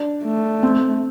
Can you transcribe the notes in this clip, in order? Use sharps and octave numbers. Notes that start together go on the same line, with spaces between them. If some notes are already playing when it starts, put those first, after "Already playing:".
Already playing: D4
A3
C4